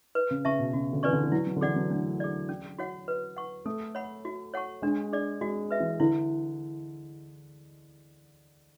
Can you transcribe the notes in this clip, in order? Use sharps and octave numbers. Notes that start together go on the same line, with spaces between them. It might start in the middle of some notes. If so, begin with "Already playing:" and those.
B4
C#3
C#3 E5 A5 C#6
B2
C#3 F#4
D3
E3 B4 D5 G#5 C#6
D3
E3
F#3 E4
F#3
D3
E3 G#4 D5 F#5
F#3
A3 D4
G#4 D5
C#4
F#4 C#5 F#5
B4
F#5 C#6
A3 A4
C#5 F#5 B5
F#4
C#5 F#5 A5 C#6
G#3 D4
G#4 D5
G#3 F#4
B4 E5
E3
D3 E4